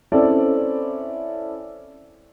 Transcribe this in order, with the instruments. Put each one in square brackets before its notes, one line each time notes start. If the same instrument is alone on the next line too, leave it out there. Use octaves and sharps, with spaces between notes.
[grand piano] C4 C#4 E4 A4 D5